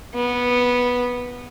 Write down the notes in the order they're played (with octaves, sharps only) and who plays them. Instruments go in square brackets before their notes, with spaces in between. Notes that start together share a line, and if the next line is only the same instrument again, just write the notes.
[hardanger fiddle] B3